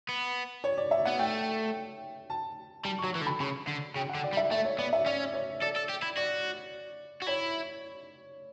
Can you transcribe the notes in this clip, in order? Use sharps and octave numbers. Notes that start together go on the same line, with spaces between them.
B3
C#5
D5
E5
B3 F#5
A3 G5
A5
G3 A5
C#6
F#3
E3 C#6
D3
B5
C#3 B5
D3
C#3 G5
F#5
D3
D5
G3
E5
A3 E5
C#5
B3 D5
E5
C#4 D5
C#5
A4 D5
A4
G4
E4
F#4 D5
F#4
E4 C#5